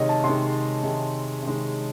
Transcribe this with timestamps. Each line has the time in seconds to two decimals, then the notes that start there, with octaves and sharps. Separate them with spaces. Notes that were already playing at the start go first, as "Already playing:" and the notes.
Already playing: C3 D#3 G#3 C#5 D#5
0.09 A5
0.23 C3 D#3 G#3 C6
0.83 C3 D#3 G#3
1.42 C3 D#3 G#3